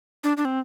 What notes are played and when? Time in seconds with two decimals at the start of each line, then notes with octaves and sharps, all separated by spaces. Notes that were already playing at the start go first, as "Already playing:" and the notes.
0.24 D4
0.37 D4
0.45 C4